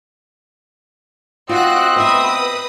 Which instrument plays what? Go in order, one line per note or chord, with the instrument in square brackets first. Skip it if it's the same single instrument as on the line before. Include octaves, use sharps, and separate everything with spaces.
[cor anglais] C4 [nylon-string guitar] F4 [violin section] F#4 F#5 F#6 [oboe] D#5
[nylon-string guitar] B3 E5 [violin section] B4 D#6